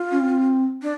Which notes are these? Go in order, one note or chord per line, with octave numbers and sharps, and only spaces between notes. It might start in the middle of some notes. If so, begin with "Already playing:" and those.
Already playing: F4
C#4
C4
D4